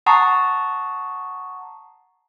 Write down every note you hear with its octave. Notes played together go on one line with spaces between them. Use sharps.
F#5 A5 A#5 C#6 D#6 C7